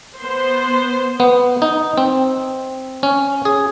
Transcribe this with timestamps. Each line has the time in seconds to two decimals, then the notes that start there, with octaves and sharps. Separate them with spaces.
0.18 B3 C5
1.20 B3
1.62 D#4
1.97 C4
3.03 C#4
3.45 G#4